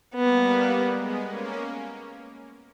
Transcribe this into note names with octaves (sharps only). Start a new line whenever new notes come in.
G3 A#3 B3
G#3 B3
A#3 C#4